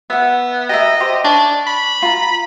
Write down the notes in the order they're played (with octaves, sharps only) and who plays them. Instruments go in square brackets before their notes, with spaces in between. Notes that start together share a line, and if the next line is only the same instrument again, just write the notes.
[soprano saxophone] B3 [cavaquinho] E5 F#5
[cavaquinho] G4 A#4 E5 [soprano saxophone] D#5
[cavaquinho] G4 C5
[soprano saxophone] D4 [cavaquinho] C#5
[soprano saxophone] B5
[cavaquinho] F4 A#5